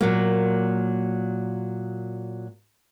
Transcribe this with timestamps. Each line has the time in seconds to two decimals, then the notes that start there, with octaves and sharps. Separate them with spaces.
0.01 A#2 F#3 A#3